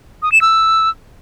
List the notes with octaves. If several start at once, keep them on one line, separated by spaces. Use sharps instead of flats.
D#6
E7
E6